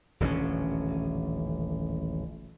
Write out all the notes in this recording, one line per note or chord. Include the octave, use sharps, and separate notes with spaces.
D#1 A1 D3 C#4